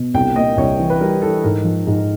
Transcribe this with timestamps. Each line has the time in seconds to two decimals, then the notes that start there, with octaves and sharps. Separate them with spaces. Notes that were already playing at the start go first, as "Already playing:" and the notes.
Already playing: B2
0.14 C2 G5
0.36 A#2 D#5
0.57 C2 C#5
0.79 E3
0.90 B4
1.01 G3 A#4
1.22 E3 A4
1.44 G#2 A#4
1.64 F3
1.87 G#2